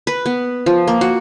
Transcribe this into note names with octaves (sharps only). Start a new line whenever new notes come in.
B4
B3
F3
A#3
F#4